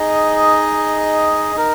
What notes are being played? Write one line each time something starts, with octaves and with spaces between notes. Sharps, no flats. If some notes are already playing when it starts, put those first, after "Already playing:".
Already playing: D#4 G#4 D#5
D#4 A#4